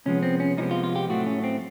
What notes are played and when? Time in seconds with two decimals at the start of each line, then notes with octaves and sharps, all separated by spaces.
0.06 C3 F3 G#3 B3 C#4
0.23 C4
0.40 C#4
0.58 C3 F3 G#3 B3 D#4
0.71 F4
0.84 F4
0.96 G4
1.09 A2 F#3 A3 C4 F#4
1.26 C#4
1.44 C4